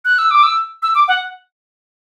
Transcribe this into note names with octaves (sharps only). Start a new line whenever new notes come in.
F#6
E6
D6
E6
E6
D6
F#5